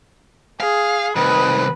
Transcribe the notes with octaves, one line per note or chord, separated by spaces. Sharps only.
G#4 F5
C2 D#3 B4